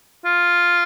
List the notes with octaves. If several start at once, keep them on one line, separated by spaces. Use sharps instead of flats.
F4